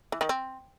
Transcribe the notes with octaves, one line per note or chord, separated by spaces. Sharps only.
E3
D#3
C4